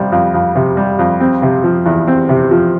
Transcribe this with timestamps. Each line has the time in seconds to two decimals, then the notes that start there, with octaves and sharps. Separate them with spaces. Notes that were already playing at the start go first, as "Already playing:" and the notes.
Already playing: F2 C3 G3
0.12 F2
0.34 F2
0.55 C3
0.77 G3
0.99 F2
1.20 C4
1.42 C3
1.64 F3
1.86 E2
2.07 C4
2.29 C3
2.51 F3